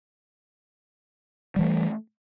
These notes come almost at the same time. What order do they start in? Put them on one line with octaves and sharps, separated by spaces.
G3 E3 A3